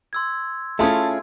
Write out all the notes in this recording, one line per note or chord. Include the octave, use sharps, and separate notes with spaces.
C6 E6 G#6
A3 C#4 E4 F4 G#4 A5